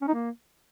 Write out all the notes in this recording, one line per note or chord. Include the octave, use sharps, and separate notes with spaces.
C#4
D#4
A#3